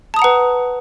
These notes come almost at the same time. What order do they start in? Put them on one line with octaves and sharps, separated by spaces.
A5 D#6 A#5 F#5 B4